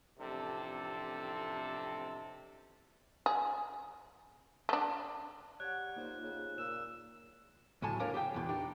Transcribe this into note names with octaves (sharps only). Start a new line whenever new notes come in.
A1 F2 C3 D4 A4
G#4
A3 D4
G3 C#5 F#5 F#6 G#6
A#3 D#4 F4 C5
C#3 C5
A#2 E6 E7
D2 A2 F#3 G#5 A5
A#3 D4 A#4 C#5
G4 G#4 G5
E2 B2
D4 D#4 G4